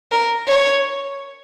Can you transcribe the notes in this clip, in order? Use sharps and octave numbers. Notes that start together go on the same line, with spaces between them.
A#4
C#5